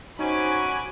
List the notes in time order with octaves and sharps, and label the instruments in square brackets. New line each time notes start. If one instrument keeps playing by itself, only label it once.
[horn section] C#4 G#5 [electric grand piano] D#4 C5 [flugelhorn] F#4 [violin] B5 D6